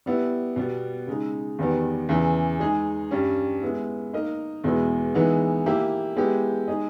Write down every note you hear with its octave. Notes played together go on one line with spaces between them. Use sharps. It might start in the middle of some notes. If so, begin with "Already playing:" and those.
G3 B3 E4
B2 G3 B3
C#3 G#3 D#4
E2 D#3 G3 B3
E2 C#3 E3
G#3 D#4 G#4
G2 G3 C#4
G#3 B3 E4
A#3 D#4 A#4 D#5
E2 B2 G#3 B3 E4
E3 G#3 B3 D#4
A#3 E4 G4
G#3 B3 E4 G4
G#3 D#4 G#4 D#5